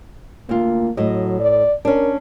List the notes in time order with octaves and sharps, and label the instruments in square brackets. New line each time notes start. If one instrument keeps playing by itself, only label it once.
[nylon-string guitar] D2 F4 [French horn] A#3
[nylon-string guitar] A2 D#5 [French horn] F#3
[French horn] D5
[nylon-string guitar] C#4 D4 [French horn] A#4